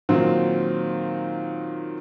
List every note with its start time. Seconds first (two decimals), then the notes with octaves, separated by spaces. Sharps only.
0.09 A#2 D#3 F#3 C4